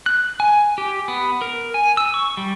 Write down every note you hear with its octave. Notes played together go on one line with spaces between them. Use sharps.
F#6
G#5
G4
B3
A#4
G#5
E6
C#6
G3